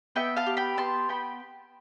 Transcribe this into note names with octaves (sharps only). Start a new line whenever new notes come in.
B3 E5 G5
F5 A5
G4
G5 B5
B3 A5 C6
B3 G5 B5